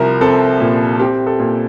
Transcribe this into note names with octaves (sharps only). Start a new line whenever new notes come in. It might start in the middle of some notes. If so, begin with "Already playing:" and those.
Already playing: C2 F3 A#4
C4 A4
A#2
C4 G4
A4
A#2